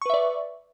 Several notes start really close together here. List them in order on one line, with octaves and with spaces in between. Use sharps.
C#6 B4 E5 D5